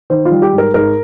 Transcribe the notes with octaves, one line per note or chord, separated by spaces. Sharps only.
D#3 C5
F4
G3
G4
G#2
A#4
G#2 A#4